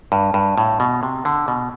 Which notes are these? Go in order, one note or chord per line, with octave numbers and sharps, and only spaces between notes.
G2
G2
A2
B2
C3
D3
B2